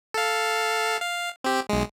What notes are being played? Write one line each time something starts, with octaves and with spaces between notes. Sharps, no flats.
A4 F5
F5
C4 G4
B1 G#3